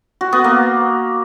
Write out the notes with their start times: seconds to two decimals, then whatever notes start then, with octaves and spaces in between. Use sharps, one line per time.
0.21 F#4
0.33 B3
0.44 A#3